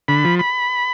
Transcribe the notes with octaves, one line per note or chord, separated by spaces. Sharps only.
D3 B5
F3
B5